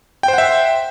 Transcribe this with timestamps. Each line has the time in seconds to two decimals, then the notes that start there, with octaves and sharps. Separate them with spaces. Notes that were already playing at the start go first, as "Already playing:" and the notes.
0.23 G5
0.28 C5
0.33 F#5
0.38 E5